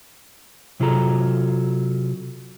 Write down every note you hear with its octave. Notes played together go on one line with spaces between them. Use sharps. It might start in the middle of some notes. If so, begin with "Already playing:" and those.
C3 F#3 F4 G#4 A4 A#5